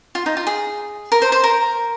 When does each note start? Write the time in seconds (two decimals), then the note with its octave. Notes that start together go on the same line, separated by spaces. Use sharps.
0.15 F4
0.26 D#4
0.37 F4
0.47 G#4
1.12 A#4
1.22 C5
1.32 C5
1.44 A#4